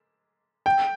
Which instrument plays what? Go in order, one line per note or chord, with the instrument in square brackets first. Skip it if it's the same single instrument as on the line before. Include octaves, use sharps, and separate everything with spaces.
[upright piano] G5